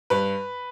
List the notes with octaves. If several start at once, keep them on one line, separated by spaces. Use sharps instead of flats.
G2 B4